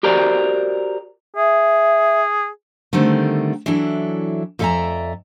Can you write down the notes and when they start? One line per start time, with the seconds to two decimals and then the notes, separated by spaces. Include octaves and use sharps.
0.03 F#4 G4 A#4 C5 D5
1.36 G#4 E5
2.93 D3 D#3 G3 A3 C4
3.66 E3 F#3 D4 E4 A4
4.59 F2 A4 D5 E5 G#5 A#5